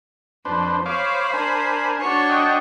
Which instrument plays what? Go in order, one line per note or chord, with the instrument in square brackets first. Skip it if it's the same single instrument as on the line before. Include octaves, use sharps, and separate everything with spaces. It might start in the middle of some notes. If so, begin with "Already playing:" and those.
[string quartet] F2 [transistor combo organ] D4 B4 C5
[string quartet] C5 B5 [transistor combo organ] C#5 F5 D6
[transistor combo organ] D4 A#4 G#5
[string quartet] D4 F#4 C#5
[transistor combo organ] D#5 F#5 G5